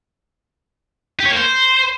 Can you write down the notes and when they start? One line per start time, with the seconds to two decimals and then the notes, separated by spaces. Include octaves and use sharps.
1.20 G4
1.26 C#5
1.31 A#3
1.36 C5